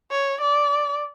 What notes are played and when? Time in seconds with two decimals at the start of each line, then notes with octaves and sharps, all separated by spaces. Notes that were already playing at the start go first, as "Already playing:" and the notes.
0.11 C#5
0.41 D5